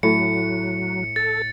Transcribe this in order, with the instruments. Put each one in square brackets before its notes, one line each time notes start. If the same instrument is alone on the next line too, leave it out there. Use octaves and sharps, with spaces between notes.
[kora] A2 [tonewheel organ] F#3 [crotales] C#7
[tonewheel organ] A4 [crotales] A6